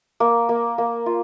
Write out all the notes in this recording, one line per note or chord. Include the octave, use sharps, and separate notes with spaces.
A#3
A#3
A#3
F4